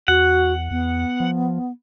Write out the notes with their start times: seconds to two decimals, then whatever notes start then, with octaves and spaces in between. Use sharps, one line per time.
0.08 E2 F#4 F#5
0.71 E2 B3
1.20 F3